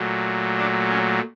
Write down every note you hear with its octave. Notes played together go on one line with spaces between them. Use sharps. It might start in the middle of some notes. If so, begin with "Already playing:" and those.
Already playing: A#2 F#3 A3
D4
C#4